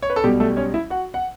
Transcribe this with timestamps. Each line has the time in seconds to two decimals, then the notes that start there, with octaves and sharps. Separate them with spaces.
0.02 C#5
0.10 B4
0.16 A4
0.24 B1 B2 G3 G4
0.40 A3 A4
0.57 C#4 C#5
0.74 E4 E5
0.90 F#4 F#5
1.14 F#5